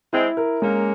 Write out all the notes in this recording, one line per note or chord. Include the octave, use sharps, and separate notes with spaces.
G#3 C4 E4
A#4
G#3 A#3 C#4